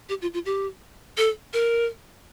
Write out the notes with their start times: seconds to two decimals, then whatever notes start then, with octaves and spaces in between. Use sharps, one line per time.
0.09 G4
0.22 F4
0.34 F4
0.45 G4
1.17 A4
1.53 A#4